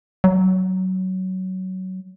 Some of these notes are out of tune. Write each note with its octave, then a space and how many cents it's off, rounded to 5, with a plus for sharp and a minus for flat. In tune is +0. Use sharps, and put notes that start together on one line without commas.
F#3 +15